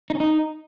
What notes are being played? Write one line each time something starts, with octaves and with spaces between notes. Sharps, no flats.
D#4
C#4
D#4